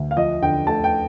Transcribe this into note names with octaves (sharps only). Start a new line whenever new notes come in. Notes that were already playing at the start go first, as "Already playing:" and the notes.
Already playing: D2
F5
F3 D#5
D3 G5
A3 A5
G5